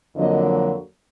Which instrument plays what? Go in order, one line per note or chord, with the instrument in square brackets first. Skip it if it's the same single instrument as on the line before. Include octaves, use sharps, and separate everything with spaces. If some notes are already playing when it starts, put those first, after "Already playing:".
[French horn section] F2 D3 F#3 A#3 D#5